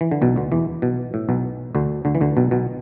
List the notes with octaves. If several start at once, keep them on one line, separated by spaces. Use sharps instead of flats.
E3
D3
B1 B2
D2 D3
E2 E3
B1 B2
A2
B1 B2
D2 D3
D2 D3
E3
D2 D3
B1 B2
B1 B2